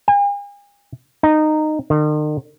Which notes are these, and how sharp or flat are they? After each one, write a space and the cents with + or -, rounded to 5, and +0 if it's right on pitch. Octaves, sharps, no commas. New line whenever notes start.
G#5 -45
D#4 -15
D#3 -45